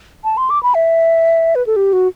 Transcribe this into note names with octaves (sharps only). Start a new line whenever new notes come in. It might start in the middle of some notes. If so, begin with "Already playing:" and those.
A5
C6
D6
B5
E5
B4
A4
G4
F#4